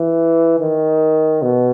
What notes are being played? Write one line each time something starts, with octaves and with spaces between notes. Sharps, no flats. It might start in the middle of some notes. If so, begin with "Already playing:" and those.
Already playing: E3
D#3
B2